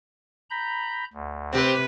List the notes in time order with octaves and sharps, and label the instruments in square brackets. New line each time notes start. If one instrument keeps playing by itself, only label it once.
[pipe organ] A#5 B5 G6
D2
[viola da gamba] C3 B4 [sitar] C4 G4